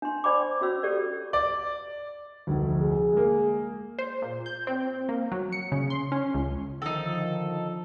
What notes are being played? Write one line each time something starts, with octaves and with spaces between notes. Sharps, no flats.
D4 C6
C5 D5 G5 B5 D6
C#4 F#4 C#5 E6
G4 A4 C#5 D5
D5
F1 D2
G#4
G#3 A#3
C5
A#2
G6
C4
A#3
F#3
C#7
C#3
C6
C#4
C#2
D3 D#3 F3 D#4 A4